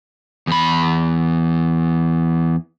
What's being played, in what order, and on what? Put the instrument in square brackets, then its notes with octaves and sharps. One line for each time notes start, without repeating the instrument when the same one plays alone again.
[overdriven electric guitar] E2 B5